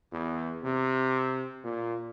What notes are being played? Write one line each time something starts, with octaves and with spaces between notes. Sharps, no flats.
E2
C3
A#2